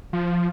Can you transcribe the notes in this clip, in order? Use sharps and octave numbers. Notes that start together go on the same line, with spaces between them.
F3